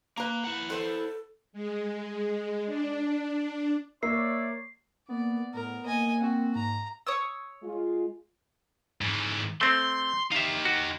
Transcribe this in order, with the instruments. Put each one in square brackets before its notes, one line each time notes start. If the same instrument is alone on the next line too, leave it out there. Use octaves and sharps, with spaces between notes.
[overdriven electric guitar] A#3 [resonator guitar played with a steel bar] B4 A#5
[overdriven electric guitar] E4 F#5
[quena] A4 [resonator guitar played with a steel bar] B4 C5
[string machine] G#3
D4
[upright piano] A#3 [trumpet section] C#5 D5 [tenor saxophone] E5 [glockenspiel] C7
[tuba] A#3 [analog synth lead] B3 [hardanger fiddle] D5
[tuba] A2 [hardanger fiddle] A#4
[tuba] A#3 [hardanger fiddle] D#5 G#5
[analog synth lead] C4 [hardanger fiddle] F#4
[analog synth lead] G#2 [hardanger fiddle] A#5
[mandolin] C#5 D#6 E6
[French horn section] G#3 F4
[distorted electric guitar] G#2 E3
[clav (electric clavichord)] A3 C4 [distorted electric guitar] C6
[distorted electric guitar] D#4 G4 [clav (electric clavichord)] E5 F5
[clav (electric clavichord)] F#4